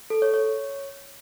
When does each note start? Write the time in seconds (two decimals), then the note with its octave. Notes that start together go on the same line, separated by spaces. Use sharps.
0.10 A4
0.22 C#5
0.34 C#5